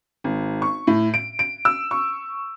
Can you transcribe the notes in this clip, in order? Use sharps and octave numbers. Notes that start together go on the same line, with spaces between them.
G#1
C#6
A2
D7
D7
E6
C#6